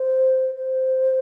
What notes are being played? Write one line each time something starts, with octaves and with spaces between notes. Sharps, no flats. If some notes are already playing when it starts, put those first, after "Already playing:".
Already playing: C5
C5